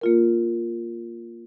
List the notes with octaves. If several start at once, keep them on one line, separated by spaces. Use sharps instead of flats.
A#3 F4 A#4